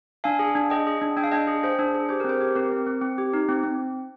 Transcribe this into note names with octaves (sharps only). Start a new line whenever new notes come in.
D4 F5 G#5
G#4
D4
G#4 D#5 G5
G#4
D4
D4 G5
F5
D4 D#5 G5
G#4
G#4 C5
D4
G#4
G4 C5
C4 A#4
C5
G4
C4 A#4
C4
C4
C4
G4
D#4
C4
C4